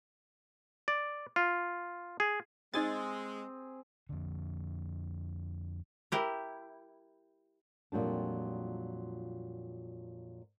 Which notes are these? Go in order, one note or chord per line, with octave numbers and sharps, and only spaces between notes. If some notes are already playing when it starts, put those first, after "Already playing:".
D5
F4
G#4
G#3 C4 D#4 G#4 G#5 A6
F2 D3
E4 G4 A#4
F2 A#2 F#3 G3 D4